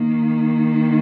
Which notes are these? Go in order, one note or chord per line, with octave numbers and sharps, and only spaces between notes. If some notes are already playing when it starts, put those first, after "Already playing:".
Already playing: D#3 A#3